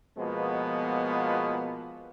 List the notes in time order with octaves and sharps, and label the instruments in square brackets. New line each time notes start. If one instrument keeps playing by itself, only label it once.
[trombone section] B2 F3 G#3 A#3 B3